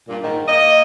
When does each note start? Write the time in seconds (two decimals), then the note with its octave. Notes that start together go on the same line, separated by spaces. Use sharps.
0.07 G2 A#2
0.22 G#2 D#3
0.48 A#3 D#5